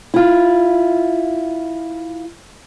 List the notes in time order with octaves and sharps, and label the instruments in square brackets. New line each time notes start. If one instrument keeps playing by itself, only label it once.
[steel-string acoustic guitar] E4 F4